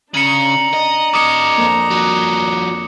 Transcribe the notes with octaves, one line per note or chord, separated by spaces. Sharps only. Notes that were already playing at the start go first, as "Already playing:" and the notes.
C#3 D4 A#5 C#7 F#7
D#5
A4 D#5 D6 D#6 C#7
F2 A#3
F3 F#4